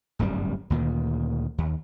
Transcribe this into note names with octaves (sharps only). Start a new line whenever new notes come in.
D1 G1 F#2 G3
D2 A#2 D#3
D#2